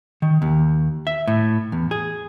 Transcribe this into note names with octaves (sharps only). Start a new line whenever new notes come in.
D#3
D#2
E5
A2
E2
G#4